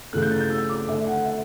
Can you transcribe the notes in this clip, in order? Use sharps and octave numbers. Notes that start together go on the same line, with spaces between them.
C#3 E3 A3 F#6
G6
A6
G6
E6
D6
D3 A3 E5
F#5
E5